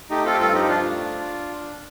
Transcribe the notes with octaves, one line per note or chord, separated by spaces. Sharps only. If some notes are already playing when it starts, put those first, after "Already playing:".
A3 D#4 G4
C4 F4 A4
G4
G2 F4 A4
F3 D#4 G4
G2 D4 F4
A3